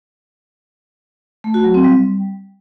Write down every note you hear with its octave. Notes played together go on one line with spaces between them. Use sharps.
A3
F#4
F#3
C4
G3